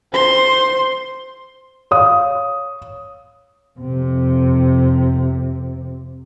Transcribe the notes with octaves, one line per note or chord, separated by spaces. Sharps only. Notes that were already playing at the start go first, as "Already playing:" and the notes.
C5 C6
C#5 F5 D#6
F2 C3